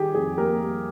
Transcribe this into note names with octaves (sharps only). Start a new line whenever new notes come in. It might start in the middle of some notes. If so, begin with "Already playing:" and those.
Already playing: D#3 G3 G4 G#4
F2 G#4
A#3 G4 A#4
G3